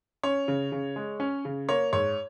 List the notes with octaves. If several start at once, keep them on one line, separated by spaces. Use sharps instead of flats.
C#4 C#5
C#3
C#3
G#3
C#4
C#3
A#3 C#5
G#2 C#5